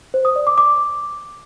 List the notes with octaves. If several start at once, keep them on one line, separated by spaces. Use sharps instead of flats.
C5
D#6
D5
D6
D6